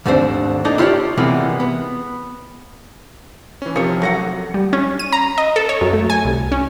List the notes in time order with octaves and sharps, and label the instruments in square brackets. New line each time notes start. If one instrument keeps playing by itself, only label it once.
[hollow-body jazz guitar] D#2 G#2 A3 C4 D4 C5
A#3 D4 D#4 A4
E4 F4 G4 A4 C#5 D5
C3 E3 G#3 A#3 B3
B3
[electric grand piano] E3 C#4
[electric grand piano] C3 F3 C#7 [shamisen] D#3 C#5
[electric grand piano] F#3 A#6 C#7 [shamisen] A3 A#4 F#5
[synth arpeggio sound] G3
C#4
D#7
A#5
D#5
A4
C#5
F#2
A3
G#5
C2
C#4